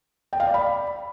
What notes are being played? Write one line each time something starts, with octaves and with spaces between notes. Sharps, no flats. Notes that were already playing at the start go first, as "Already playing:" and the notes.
G5
F5
D5
B5